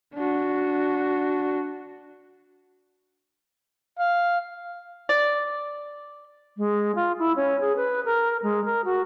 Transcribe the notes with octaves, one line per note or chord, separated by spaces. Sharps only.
D4 F#4
F5
D5
G#3
F4
E4
C#4
G#4
B4
A#4
G#3
A#4
F#4